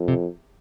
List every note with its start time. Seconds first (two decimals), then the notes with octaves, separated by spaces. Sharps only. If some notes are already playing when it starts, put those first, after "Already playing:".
Already playing: F2
0.08 C3